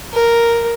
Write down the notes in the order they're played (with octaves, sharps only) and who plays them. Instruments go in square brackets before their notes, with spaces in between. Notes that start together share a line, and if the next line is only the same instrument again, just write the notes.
[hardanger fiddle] A#4